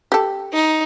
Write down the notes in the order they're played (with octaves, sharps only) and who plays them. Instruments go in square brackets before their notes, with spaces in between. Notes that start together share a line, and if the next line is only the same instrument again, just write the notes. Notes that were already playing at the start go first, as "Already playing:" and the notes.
[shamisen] G4 A4
[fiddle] D#4